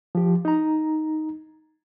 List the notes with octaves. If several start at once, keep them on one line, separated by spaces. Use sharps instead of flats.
F3 G4
D#4 A#5